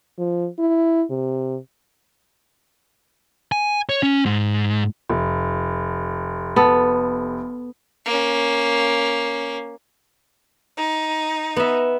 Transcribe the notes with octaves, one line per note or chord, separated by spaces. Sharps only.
F3
E4
C3
G#5
C#5
C#4
G#2
F1
B3 A4
A#3 C#4
D#4
B3 E5